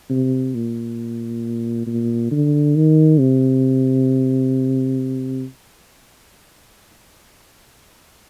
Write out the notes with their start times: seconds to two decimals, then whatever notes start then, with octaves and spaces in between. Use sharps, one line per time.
0.10 C3
0.55 A#2
1.87 A#2
2.31 D3
2.76 D#3
3.20 C3